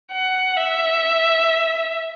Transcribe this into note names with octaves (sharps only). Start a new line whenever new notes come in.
F#5
E5